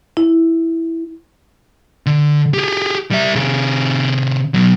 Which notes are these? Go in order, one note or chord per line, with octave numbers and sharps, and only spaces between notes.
E4
D3
G4 G#4
G3 E5
C3 G#4
B2 F#3